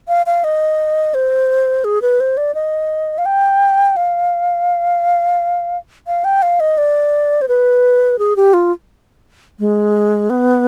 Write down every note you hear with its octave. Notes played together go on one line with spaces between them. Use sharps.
F5
F5
D#5
C5
G#4
B4
C5
D5
D#5
F5
G5
F5
F5
G5
F5
D#5
D5
C5
B4
G#4
G4
F4
G#3
B3